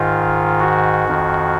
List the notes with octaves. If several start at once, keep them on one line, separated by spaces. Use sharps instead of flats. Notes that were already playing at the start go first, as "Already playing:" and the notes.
Already playing: G#2 D#3 F4
F#4
F2 D#3